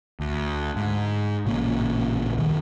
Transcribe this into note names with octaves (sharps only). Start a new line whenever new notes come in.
D2
G#2
A1 A#2 C#3 A#3
D1 C2 F2 D#3